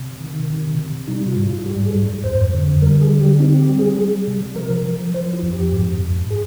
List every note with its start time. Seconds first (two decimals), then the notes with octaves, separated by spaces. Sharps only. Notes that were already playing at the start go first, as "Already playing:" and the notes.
Already playing: C3
0.21 D#3
0.50 C3
0.79 C3
1.08 G3 D#4
1.28 F4
1.37 G#2
1.47 F4
1.66 G3 G4
1.85 G#4
1.95 G#2
2.24 F2 C5
2.54 D3
2.82 G3 A#4
3.01 G#4
3.11 D3
3.21 G4
3.40 C4 D#4
3.59 G4
3.69 G3
3.79 G#4
3.98 G3
4.27 C3
4.56 F3 A#4
4.85 F3
5.14 F3 C5
5.33 F4
5.43 F2
5.53 G4
5.72 G#2
6.01 G#2
6.30 G#4